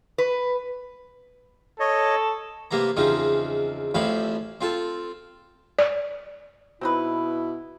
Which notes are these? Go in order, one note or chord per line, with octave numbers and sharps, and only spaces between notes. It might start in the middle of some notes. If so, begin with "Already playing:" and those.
B4
A4 C#5 D#5
C3 A#3 B3 A#5
E2 C#3 F3 C4 D#4
A1 A2 F3 C4 F5 B5
C4 F4 A4
D5
B2 C4 D#4 E4 B4